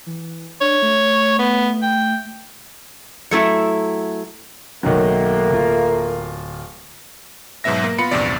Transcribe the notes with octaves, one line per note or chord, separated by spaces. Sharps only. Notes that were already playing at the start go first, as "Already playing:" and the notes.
E3
D4 C#5
A3
B3
G5
F#3 A3 E4
B1 D#3 F#3 A3 A#3
D1 F4
G#2 B2 F#3 B3 E5 A#6
A#3
B3 F4 B5 C#7
A#1 E2 G2 C3 D5